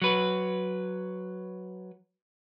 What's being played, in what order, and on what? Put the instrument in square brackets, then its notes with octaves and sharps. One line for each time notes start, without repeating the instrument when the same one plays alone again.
[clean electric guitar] F#3 B4